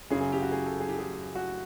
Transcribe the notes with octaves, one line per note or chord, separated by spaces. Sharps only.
F#2 C#3 F#3 G#4
G#4
G4
F#4
G#4
A4
G#4
G4
G#4
F#4